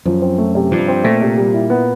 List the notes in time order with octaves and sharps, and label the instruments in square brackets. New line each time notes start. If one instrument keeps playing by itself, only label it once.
[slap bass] F#2 [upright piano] F3
[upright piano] C4
A3
C3
[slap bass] G2 [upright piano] F3
[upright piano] C4
[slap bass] A#2 [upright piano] A3
[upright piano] C3
G3
E4
B3